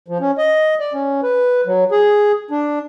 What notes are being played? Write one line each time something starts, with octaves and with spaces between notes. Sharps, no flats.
F3
C#4
D#5
D5
C#4
B4
F#3
G#4
D4